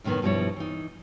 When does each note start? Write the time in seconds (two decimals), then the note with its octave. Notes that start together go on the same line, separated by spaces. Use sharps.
0.04 F#2 A2 C3 D#3 B3
0.22 G2 B2 F3 G3 E4 C#5
0.56 E3 D#4